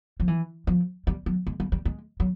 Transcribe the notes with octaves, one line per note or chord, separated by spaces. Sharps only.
F3
E3
F3
G3
F#3
G#3
G3
G3
G#3
F#3